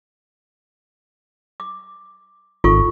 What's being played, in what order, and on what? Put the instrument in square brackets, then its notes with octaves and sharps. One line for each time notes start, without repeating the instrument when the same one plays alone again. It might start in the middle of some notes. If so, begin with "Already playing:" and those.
[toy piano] D6
[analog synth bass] G#1 [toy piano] F4 A4 C#6